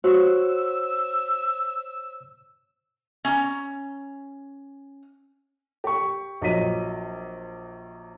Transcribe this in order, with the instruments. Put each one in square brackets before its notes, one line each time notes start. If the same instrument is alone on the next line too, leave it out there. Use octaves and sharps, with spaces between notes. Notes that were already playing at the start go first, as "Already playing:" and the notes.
[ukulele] F#4 [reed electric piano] C5 C#5 [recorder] E6
[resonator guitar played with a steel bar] C#4 A#5
[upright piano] G4 C#6
A#1 F#3 D#5 B6 D#7